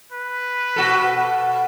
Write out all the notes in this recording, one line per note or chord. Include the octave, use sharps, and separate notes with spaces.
B4
B2 F#4 A4